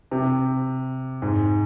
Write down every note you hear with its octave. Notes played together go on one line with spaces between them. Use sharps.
C3
G#2